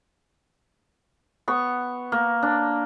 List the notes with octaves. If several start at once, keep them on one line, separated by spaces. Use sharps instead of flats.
B3 C#6
A#3
D4